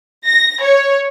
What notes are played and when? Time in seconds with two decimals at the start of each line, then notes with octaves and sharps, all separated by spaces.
0.25 A#6
0.61 C#5